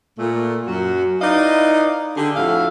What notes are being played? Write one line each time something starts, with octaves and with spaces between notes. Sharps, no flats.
A#2 A3
F#2 F#3 F#4
D#4 E4 B4 D5 D#5 F5
D3 G4 G#4
F2 A2 F#4 E5 F5